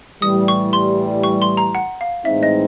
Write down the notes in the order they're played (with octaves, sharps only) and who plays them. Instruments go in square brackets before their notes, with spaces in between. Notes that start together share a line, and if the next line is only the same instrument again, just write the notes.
[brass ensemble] A2 E3 G3 [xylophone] D#6
[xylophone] C#6
C6
C#6
C6
A#5
F#5
F5
[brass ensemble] A2 E3 G#3 C4 D#4 [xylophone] E5
[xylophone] D#5